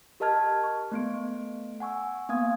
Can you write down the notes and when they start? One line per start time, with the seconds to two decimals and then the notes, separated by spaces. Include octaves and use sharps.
0.20 G4 A#4 D#5 A5 F6 G#6
0.64 C#6
0.92 A3 B3 D7
1.80 F#5 G#5 C#6 E6
2.29 A#3 B3 F5 G#5 D#6 G#6